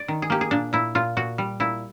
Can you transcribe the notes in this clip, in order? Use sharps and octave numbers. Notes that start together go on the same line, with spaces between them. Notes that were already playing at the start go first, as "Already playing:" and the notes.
Already playing: D5
D#3
G#4
A#3 G4
G#4
A#2 D4
A#2 E4
A#2 F4
A#2 F#4
G3
A#2 E4